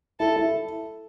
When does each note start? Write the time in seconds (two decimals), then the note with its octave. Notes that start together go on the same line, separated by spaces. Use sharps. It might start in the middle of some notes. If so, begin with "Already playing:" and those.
0.20 E4 A4
0.36 E4